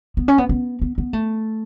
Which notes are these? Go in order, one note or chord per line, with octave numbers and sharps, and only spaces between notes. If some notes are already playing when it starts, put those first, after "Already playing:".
B3
C#4
B3
B3
B3
B3
A3